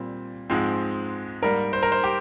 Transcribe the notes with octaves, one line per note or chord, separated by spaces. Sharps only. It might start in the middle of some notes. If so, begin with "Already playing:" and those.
Already playing: A#2 G3 C4
G#2 F3 G#3 C4
G#2 G3 A#3 A#4
C5
A#4
C5
G4